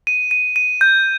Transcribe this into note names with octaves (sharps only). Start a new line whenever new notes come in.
D#7
D#7
D#7
G6